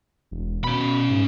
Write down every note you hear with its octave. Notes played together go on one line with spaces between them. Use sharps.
E1
B2 C#4 B5
G#2